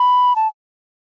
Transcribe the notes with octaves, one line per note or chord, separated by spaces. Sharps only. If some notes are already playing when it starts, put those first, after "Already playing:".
Already playing: B5
A5